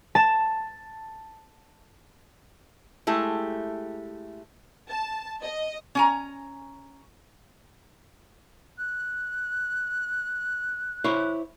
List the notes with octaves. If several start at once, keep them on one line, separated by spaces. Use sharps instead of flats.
A5 E7
G#3 A3 E4 G4
A5
D#5
C#4 G#5 A#5
F#6
E4 C5 C#5